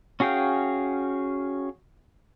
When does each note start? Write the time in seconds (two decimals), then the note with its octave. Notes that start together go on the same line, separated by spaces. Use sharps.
0.20 C#4 F#4 G#4 F5 G5